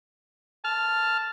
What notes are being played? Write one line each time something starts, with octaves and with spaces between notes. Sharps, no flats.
A5 F6